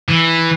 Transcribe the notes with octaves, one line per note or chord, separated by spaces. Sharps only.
E3